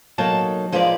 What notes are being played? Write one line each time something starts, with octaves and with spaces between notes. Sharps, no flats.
B2 F#3 A#3 D#4 A4 A5
F3 G#3 A#3 D#4 B4 D5